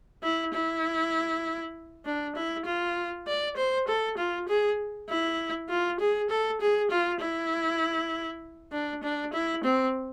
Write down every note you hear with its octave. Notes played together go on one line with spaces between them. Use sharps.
E4
E4
D4
E4
F4
D5
C5
A4
F4
G#4
E4
F4
G#4
A4
G#4
F4
E4
D4
D4
E4
C4